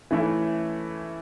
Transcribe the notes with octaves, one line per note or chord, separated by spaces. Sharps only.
E3 A3 C#4 E4